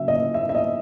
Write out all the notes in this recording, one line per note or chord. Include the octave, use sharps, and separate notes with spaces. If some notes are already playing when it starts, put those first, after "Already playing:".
Already playing: C#3 F#3 E5
D#5
E5
E5
D#5